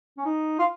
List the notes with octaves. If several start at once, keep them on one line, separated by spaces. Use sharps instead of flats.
C#4
D#4
F4